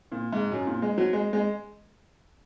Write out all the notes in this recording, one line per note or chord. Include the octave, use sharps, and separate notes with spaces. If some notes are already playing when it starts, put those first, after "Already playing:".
A#2
G#2
F#2
A#2
G#3
F#3
G#3
G#3